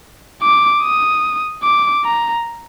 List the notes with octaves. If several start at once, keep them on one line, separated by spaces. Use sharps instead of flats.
D6
D#6
D6
A#5